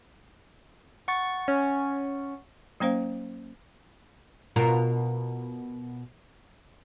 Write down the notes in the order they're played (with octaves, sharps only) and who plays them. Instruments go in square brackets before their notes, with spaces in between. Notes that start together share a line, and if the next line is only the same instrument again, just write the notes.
[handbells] F#5 C#6 A6
[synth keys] C#4
[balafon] F#3 A#3 C#4 C5 F5
[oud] B2 F4 A#4